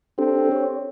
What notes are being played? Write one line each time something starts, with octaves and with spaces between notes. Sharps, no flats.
C4 D4 G4 A4
C#5